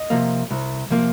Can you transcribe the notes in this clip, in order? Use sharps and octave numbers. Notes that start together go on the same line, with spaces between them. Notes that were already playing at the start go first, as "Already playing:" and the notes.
Already playing: D#5
C3 F3 A#3
C2
C3 F3 A#3